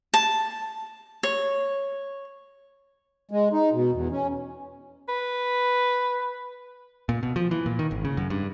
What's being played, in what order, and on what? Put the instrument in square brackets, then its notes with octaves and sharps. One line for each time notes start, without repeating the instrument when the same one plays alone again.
[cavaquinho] A5
C#5
[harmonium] G#3
D#4
B2
E2
C#4
[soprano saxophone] B4
[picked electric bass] A#2
B2
F3
E3
A#2
D#3
G#1
C#3
F#2
G2